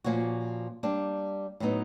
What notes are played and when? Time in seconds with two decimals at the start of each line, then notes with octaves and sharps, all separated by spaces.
0.04 A#2 F3 A#3 C#4 F#4
0.83 G3 A#3 D4
1.60 A2 F#3 B3 D#4